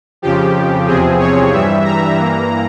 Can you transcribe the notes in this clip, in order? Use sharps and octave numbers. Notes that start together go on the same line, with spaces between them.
F2 C#3 F3 G4
E2 C3 F3 C4 G#4
C#5
G2 E3 G3 E5
A#5
G2 E3 A#3